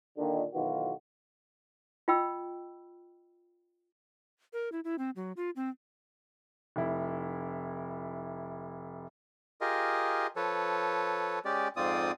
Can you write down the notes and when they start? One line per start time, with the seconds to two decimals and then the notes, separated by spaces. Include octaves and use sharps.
0.18 A#2 D3 D#3
0.54 B1 B2 D#3 E3 F4 F#4
2.08 F4 D#5 G5 B5 E6
4.53 A#4
4.72 E4
4.84 E4
4.98 C4
5.16 F#3
5.37 F4
5.56 C4
6.76 F1 E4
9.61 F4 G4 G#4 A#4 D#5
10.36 F3 A4 B4 C#5
11.45 G#3 C#4 G4 D5
11.76 F2 G#2 C4 F4 D5 D#6